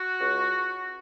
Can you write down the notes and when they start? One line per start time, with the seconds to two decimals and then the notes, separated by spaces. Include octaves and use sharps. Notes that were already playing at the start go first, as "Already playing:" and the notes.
Already playing: F#4
0.19 C#2